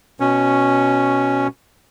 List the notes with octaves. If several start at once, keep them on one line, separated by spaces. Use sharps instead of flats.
B2 C#4